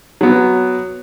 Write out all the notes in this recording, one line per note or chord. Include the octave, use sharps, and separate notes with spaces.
F#3 B3